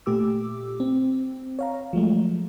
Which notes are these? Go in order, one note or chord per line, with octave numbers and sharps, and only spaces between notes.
A#2 A3 G4 D6 E6
C4
C#5 F5 A#5
F3 F#3 G#3 A3